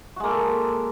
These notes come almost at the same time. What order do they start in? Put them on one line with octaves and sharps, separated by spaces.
F#4 G#3 A#3 A4